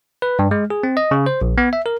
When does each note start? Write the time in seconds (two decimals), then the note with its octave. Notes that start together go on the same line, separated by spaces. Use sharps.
0.22 B4
0.39 G2
0.51 G#3
0.70 G#4
0.83 C4
0.97 D#5
1.11 C#3
1.26 C5
1.42 A#1
1.58 B3
1.73 E5
1.86 A#4